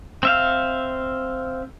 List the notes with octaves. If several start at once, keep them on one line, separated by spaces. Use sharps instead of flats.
C4 E5 F5